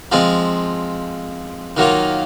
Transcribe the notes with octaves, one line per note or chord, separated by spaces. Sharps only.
F3 G#3 C4
D#3 F#3 A#3 F4